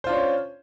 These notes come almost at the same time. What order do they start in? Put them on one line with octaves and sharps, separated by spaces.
C5 F4 D4 C#5 C#4